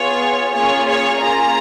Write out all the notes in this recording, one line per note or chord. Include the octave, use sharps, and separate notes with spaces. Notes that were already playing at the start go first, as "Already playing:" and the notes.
Already playing: B3 F4 G#4 C#5
A#3 C#4 F4 G#4 C#5
C#5
A#3 C#4 F4 G#4 A#5